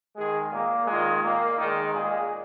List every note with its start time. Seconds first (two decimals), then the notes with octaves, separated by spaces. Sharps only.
0.16 D#3 G#3 G#4
0.52 A#2 A#3
0.87 D#3 G#3 F4
1.23 A#2 A#3
1.58 D#3 G#3 D#4
1.94 A#2 G#3 G#4